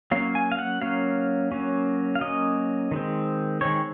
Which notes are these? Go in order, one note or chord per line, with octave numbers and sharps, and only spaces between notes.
F#3 A#3 C#4 F5
G#5
F5
F#5
F#3 A#3 C#4 F5
F#3 A#3 C#4
F5
F#3 A#3 C#4 D#5
D#3 G#3 C4
D#3 G#3 C4 C#5